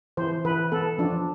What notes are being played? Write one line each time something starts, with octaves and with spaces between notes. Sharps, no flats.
E3 C5
E3 B4
B3 A4
F3 D4